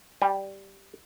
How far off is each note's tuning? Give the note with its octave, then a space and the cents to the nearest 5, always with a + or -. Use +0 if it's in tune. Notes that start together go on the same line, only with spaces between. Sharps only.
G3 -5 G5 +45 A#5 -20